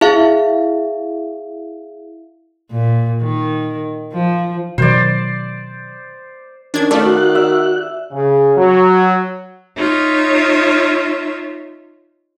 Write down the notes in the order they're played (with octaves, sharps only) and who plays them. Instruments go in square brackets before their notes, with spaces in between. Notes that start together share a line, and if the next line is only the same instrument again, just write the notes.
[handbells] E4 G#4 E5 F5
[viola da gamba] A#2
D#3
F3
[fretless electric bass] B2 D#3 F#3 [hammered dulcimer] C5 D5
[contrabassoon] D#3 [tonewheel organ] C#4 [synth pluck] D4 G#6
[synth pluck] A3 [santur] D5 F5
[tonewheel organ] F#4 F#6
[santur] E5
[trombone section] C#3
F#3
[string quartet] D#4 F4 C#5 E5